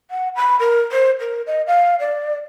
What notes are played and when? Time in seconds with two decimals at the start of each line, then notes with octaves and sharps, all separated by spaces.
0.11 F#5
0.36 B5
0.60 A#4
0.92 C5
1.20 A#4
1.47 D#5
1.67 F5
2.00 D5